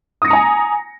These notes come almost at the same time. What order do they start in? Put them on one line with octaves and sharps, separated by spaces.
D#6 A#6 C#7 A#5 G#5